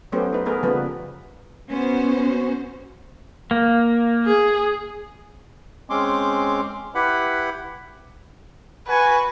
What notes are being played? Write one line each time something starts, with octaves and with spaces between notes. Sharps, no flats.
F#3 A3 B3 C#4 G4 C5
D#4 B4
A3 B3 G#4 A#4 B4
C#3 F3 G3 A#3 B3 B4
B3 C#4 F#4 C5
A#3
G#4
G#3 C4 C#4 C6 D6
E4 G4 B4 F#5 B5
F#4 B4 G#5